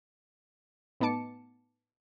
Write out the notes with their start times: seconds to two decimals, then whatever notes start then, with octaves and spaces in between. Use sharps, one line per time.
1.00 A2 B3 D#4 A5 D6 C#7